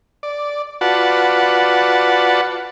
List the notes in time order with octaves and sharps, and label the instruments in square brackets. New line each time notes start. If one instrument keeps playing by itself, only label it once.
[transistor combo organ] D5
F4 F#4 B4 D5 F#5 A5